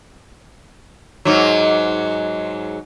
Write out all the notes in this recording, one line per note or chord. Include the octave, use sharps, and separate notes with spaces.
G#2 F#3